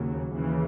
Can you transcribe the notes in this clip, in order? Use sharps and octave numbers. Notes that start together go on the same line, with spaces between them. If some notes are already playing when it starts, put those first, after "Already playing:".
Already playing: D#2 C#3 F#3
D#2 C#3 E3